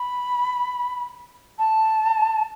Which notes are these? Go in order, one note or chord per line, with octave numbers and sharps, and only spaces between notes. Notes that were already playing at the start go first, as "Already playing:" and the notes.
Already playing: B5
A5